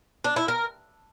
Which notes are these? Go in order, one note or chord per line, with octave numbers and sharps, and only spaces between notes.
D4
E4
A#4